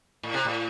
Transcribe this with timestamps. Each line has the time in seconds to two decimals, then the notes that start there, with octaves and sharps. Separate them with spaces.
0.23 A2
0.34 C3
0.45 A2